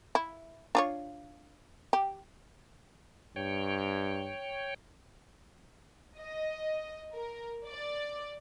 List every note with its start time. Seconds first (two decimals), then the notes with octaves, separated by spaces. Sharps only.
0.15 E4
0.75 D4 F4 C#5
1.93 G4
3.36 G2 C#5 G5
6.20 D#5
7.16 A#4
7.68 D5